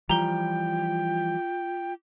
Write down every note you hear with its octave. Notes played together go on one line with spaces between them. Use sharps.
E3 F3 G3 F4 G5 A#5 G7